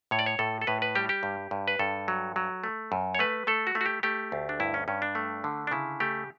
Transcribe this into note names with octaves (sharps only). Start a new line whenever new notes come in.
A2 C#5
D5
C#5
A2 A4
A4
A2 B4
B4
G3 G4
G4
G2
G2
B4
G2 A4
F#3
F#3
A3
F#2
C#5
A3 B4
A3 A4
F#4
A3
F#4
G4
A3 G4
D2
D4
G2 E4
C#4
G2 C#4
D4
A3
D3
D4
C#3 E4
A3 G4